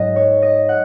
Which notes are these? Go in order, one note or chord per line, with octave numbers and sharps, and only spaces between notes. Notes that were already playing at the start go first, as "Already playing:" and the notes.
Already playing: G#2 F#3 D#5
C#5
D#5
F#5